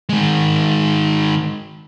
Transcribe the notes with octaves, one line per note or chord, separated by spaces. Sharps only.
D#3 G#3